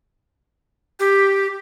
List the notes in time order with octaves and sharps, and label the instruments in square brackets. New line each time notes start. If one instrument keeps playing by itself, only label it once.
[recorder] G4